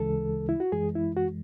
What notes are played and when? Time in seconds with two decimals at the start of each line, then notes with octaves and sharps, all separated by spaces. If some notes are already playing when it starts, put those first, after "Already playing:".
Already playing: D2 C#3 E3 G#3 A4
0.49 E4
0.60 F#4
0.72 F#2 E3 G#3 G#4
0.95 E4
1.17 F#4